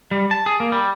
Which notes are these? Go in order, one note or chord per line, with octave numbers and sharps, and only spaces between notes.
G3
A5
G#4
A#3
G3